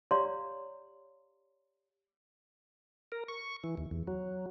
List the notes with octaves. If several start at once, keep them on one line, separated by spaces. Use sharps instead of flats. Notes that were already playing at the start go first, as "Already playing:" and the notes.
G4 C#5 D5 F5 A#5 C6
A#4
C#6
E3
D#2
E2
F#3